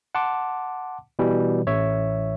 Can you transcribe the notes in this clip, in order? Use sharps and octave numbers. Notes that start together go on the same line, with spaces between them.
F#5 A5 C6 D6
B2 E3 G3
A1 C#5 E5